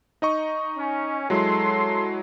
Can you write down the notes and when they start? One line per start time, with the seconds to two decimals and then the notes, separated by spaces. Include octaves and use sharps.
0.22 D#4 D#5 C#6
0.77 C#4
1.30 F#3 G#3 E4 A4 C6